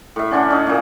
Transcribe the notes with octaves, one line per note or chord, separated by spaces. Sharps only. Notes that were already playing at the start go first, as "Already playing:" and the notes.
A2 E5
D3 C#4 D4 F#5
C#4 D#4
A#2 A#3